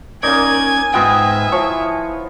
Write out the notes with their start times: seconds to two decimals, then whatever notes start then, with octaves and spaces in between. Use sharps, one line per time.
0.23 A#3 C#4 D#4 A#4 D5 G#5 G#6
0.94 G#2 B3 F4 D#5 E5 G5
1.52 F3 E4 C#5